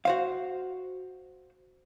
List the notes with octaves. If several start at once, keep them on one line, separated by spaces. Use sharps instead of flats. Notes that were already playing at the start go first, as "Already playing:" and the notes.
F#4 C5 F5